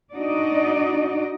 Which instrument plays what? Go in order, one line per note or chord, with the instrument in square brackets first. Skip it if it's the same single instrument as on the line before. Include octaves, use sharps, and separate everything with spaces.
[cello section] D4 D#4 F#4 D5 D#5